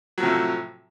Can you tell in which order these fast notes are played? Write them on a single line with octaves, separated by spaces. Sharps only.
F#3 F3 C3 A2